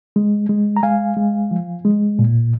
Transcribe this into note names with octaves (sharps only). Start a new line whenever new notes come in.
G#3
G#3
A#5
G#3 F5 G#5
G#3
F3
G#3
A#2